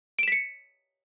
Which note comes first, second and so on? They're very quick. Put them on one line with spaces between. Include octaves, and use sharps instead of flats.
D7 E7 B6 C#7